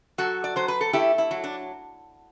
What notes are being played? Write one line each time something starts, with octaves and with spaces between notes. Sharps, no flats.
F#3 F#4 A4
D5
F#3 C5
B4
A4
A3 E4 G4
E4
F#3
D4